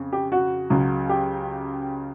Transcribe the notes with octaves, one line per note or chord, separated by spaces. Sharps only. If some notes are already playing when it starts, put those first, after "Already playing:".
Already playing: F2 C#3
G4
F#4
C#2 C#3 F#3
G4